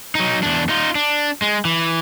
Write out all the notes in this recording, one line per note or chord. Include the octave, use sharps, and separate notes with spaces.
F#3 D#4
E2 D4
D#4 F4
D4
G#3
E3